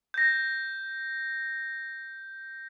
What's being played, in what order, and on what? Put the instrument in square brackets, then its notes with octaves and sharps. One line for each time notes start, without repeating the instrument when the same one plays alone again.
[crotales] G6 A#6